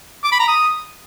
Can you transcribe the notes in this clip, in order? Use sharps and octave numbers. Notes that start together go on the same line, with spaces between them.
D6
B5
A#5
D#6